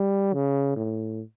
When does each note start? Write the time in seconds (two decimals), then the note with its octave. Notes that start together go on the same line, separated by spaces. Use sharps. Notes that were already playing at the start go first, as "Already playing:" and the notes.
Already playing: G3
0.33 C#3
0.76 A2